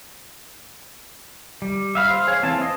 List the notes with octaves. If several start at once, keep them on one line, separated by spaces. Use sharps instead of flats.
G3
E5 F5 B5
C5 F5
G#4 C#5 F5
E3 C4 A5
C4 D#5